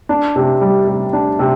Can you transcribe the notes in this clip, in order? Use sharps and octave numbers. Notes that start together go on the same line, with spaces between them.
D4
C3
G3
C3
D4
C3